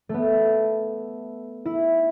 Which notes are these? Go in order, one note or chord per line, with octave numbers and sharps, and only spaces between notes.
A3 B3
E4